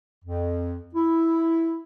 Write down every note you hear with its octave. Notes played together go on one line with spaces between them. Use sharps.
F2
E4